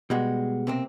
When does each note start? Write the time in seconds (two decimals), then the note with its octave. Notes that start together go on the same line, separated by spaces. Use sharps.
0.10 B2 G3 G#3 B3 F#4
0.67 C3 A#3 C4